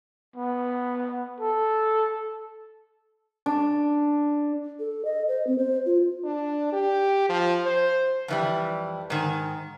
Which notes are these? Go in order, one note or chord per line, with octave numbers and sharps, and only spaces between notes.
B3
A4
D4
A4
D#5
C5
C4
C5
F4
D4
G4
F3
C5
F2 E3 G3
G#2 D#3